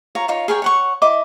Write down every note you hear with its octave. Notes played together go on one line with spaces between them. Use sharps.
F4 C#5 A#5
D#4 F4 C#5
G#4 A#4 C#5 G5
C#5 F#5 C#6
E4 D#5 D6